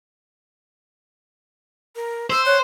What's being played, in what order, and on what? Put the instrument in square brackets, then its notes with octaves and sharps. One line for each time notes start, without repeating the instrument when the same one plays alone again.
[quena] A#4
[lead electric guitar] C5 [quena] E6
[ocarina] C#5 [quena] F#6